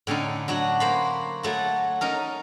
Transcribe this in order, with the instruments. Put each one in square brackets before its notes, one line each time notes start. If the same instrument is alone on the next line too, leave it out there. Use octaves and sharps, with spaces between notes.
[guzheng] A2 D3 C#4 D#4
F#3 D4 F#4
A#3 C5 B5
F#3 A3 F#4
C#4 D#4 A#4